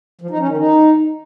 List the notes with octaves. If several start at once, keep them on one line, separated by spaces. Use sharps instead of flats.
F3
D#4
C#4
D#3
D#4